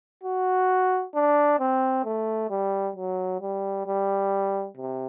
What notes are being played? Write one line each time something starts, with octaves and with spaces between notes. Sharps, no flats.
F#4
D4
C4
A3
G3
F#3
G3
G3
C3